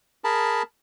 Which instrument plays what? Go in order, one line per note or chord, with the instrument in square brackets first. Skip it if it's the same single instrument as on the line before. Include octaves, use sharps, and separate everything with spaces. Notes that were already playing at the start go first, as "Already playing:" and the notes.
[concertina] G#4 A#4 A5 B5